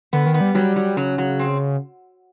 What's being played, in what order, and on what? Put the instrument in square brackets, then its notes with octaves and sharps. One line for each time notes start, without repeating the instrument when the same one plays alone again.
[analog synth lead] D3 [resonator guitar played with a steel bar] B3
[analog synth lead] D#3
[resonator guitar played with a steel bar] B3
[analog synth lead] G3
[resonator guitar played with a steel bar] F#3 [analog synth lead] G3
[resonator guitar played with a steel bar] F#3
[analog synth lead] C#3 [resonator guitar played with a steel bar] F#3
[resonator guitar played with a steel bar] F#3
C4